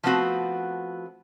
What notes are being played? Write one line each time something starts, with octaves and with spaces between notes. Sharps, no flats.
F3 A3 B3 C4 F#4